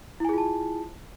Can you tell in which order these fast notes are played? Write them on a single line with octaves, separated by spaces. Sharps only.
E4 G#5 G#4 F4 A5